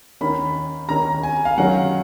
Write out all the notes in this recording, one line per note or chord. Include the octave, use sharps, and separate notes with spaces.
D#2 D#3 A#3 C#4 B5
D#2 D#3 A#3 C#4 A#5
G#5
F5
F#2 D#3 F#3 C#4 F#5